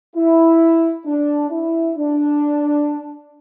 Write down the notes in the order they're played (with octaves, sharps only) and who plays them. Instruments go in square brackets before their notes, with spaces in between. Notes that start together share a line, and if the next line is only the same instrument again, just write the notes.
[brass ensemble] E4
D4
E4
D4